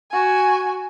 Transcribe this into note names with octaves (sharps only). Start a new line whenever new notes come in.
F#4 G#5